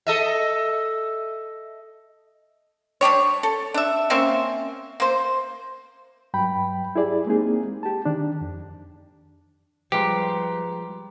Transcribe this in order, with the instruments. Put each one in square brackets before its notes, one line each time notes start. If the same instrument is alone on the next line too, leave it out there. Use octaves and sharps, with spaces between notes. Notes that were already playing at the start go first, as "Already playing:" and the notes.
[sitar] A4 D#5 E5
[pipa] G3 D4 G4 C#5
A4
D4 E5
A#3 C4 C#4 E5
A#3 C5
[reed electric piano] G2 F#3 G5 B5
E4 G4 G#4 D5
G#3 A#3 C4 D#4 G#4
G4 A5
D#3 D4
F2
[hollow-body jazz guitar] F3 G#3 [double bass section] G3 [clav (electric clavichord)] G4 [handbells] B4 A#5 C6